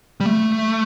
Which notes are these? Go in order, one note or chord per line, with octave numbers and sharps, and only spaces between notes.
G3
A3